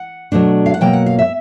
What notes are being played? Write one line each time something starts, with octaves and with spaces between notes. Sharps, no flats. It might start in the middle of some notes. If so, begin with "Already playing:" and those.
Already playing: F#5
B2 F#3 A3 D4
F5
F#5
B2 F#3 A#3 G5
F#5
F5
E5